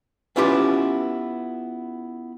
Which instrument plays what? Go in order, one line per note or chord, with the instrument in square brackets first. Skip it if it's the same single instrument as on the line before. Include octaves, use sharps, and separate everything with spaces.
[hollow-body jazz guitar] B3 C#4 E4 F4 G4 B4